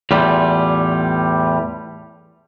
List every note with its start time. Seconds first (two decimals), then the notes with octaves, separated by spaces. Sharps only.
0.11 E2 A2 G3 F4